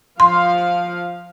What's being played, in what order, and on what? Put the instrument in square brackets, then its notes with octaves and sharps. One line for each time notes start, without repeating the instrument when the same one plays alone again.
[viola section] F3 F5 [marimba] C6